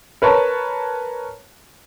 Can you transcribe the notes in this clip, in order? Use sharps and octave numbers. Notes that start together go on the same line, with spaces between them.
A#4 B4 C#5 A5